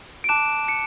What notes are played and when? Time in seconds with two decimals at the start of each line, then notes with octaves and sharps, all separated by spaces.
0.24 D7
0.29 A5 D6 F#6 E7
0.68 C#7